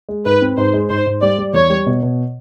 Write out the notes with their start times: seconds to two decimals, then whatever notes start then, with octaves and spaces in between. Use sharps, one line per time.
0.09 G#3
0.26 G#2 B4
0.42 C4
0.57 G#2 C5
0.74 G#3
0.90 G#2 C5
1.06 G#2
1.22 G3 D5
1.38 G3
1.53 E2 C#5
1.70 G3
1.86 B2
2.03 B2